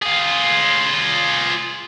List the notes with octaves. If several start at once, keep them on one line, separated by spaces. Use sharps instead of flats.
F4 G#4